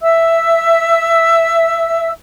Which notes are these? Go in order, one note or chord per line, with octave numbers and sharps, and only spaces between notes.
E5 E6